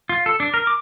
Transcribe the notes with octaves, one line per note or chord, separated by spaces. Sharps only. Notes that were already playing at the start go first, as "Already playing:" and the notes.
F4
A4
D4
A#4
D6